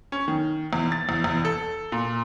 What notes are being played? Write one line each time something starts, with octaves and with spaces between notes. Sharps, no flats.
C#4
D#3
E2
A6
E2
E2
A4
A#2